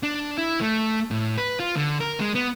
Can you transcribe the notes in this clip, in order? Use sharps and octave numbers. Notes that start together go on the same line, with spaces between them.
D4
E4
A3
A2
B4
F4
D3
A#4
G#3
B3